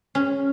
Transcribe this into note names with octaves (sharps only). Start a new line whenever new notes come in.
C#4